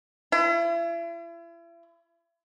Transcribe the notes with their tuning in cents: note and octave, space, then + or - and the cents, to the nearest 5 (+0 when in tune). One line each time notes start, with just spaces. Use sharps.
E4 +40